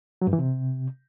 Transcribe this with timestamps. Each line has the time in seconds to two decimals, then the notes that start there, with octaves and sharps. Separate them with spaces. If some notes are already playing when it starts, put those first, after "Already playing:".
0.22 F#3
0.27 G2
0.33 E3
0.39 C3